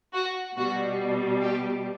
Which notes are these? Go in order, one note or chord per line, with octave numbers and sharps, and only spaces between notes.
F#4
B2 G3 F#4
G4